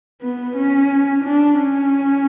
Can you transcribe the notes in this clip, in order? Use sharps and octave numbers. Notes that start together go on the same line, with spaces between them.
B3
C#4
D4
C#4